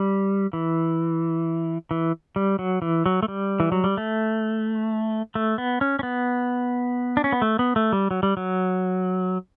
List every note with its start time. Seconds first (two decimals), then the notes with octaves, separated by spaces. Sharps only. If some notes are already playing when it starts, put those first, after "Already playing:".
Already playing: G3
0.53 E3
1.91 E3
2.36 G3
2.59 F#3
2.82 E3
3.06 F#3
3.23 A3
3.28 G3
3.60 E3
3.72 F#3
3.84 G3
3.97 A3
5.35 A3
5.58 B3
5.81 C#4
5.99 C#4
6.03 B3
7.17 D4
7.24 C#4
7.32 B3
7.42 A3
7.59 B3
7.76 A3
7.93 G3
8.11 F#3
8.23 G3
8.37 F#3